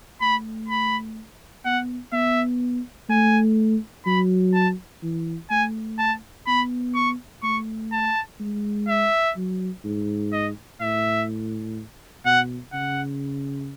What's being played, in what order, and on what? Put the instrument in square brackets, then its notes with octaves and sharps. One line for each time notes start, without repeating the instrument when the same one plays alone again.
[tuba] A3 [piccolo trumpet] B5
[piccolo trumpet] B5
[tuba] B3 [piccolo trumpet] F#5
[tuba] B3 [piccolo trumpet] E5
[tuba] A3 [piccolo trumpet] G#5
[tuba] F#3 [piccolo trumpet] B5
[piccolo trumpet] A5
[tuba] E3
[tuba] A3 [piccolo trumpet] G#5
[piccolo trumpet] A5
[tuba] B3 [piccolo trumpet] B5
[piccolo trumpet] C#6
[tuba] A3 [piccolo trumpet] C#6
[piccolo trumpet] A5
[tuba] G#3
[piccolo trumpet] E5
[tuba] F#3
G#2
[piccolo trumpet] D#5
[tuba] A2 [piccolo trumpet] E5
[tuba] B2 [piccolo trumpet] F#5
[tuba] C#3 [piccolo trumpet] F#5